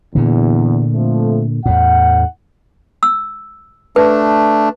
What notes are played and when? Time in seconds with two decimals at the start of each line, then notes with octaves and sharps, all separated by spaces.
0.15 E2 A#2 D3
0.94 F2 F3 A3
1.66 E2 A2 F#5
3.03 E6
3.96 A3 D4 B4